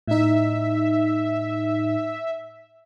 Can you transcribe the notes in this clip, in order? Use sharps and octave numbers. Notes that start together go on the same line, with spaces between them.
A2 D#4 E5